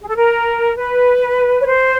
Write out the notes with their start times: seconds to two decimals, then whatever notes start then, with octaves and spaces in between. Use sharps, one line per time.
0.01 G#4
0.09 A4
0.17 A#4
0.77 B4
1.60 C#5
1.66 C5